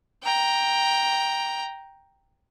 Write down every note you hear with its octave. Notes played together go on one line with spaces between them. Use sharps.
G5 A#5